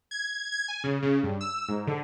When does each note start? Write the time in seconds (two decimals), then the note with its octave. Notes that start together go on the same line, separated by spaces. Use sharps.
0.11 G#6
0.52 G#6
0.68 G#5
0.84 C#3
1.03 C#3
1.23 G2
1.41 E6
1.68 G#2
1.87 D3